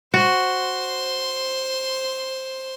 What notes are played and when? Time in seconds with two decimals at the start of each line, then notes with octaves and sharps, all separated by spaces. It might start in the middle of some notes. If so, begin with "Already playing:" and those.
0.14 F#4 C5 C6